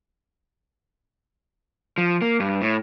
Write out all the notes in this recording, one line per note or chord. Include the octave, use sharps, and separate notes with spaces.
F3
A#3
G2
A2